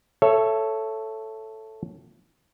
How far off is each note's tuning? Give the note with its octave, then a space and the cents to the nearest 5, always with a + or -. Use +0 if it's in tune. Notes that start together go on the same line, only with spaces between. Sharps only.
A4 +0 C#5 +0 E5 +20